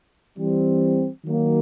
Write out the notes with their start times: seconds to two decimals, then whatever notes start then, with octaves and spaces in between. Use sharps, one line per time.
0.38 E3 G3 C4
1.25 D#3 F#3 A#3